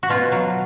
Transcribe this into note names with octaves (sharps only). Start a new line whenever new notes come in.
F#4
B2 F4
F#3